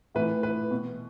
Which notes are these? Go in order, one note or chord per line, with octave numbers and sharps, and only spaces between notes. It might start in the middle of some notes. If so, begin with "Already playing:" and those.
A2 E3 B4
B4
B2